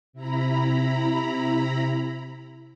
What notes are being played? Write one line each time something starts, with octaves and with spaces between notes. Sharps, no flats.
C3 E4 A#5 B5